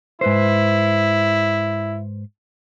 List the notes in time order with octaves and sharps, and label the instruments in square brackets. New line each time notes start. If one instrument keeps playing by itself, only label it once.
[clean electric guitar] G#2 B4 C5 [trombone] E4